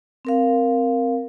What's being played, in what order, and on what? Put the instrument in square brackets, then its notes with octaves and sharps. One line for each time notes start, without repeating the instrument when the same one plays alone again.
[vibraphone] C4 A#4 F5